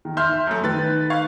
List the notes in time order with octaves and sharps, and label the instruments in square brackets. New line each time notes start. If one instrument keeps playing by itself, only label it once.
[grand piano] D#3
[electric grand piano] E5 C6 F6 [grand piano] G6
[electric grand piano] F#2 A3
[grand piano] D#3 [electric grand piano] B4 A6
[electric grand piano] F5 C#6 G#6